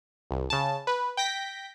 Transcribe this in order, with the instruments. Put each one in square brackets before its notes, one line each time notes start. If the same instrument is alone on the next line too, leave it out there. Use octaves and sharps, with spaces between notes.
[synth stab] C2
C#3 A5
B4
G5 G6 A#6 B6